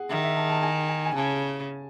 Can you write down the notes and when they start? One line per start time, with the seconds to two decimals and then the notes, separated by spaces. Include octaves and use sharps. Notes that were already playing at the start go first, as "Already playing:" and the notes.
Already playing: G#4 F#5
0.10 D#3 E5
0.24 E5
0.37 A5
0.50 A5
0.63 G#5
0.89 G#5
1.05 G#5
1.15 C#3 A5